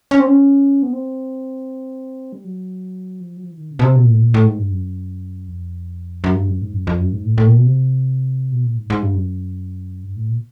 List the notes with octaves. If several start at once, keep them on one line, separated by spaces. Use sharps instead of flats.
C#4
C4
C#4
B3
C4
G3
F#3
F3
F#3
F3
E3
D#3
C#3
B2
C3
B2
A#2
A2
A#2
A2
G#2
G2
F#2
F2
F#2
G2
F#2
G#2
F#2
F2
F#2
G#2
A2
A2
A#2
B2
C3
B2
A#2
G#2
G#2
G2
F#2
G2
A2
A#2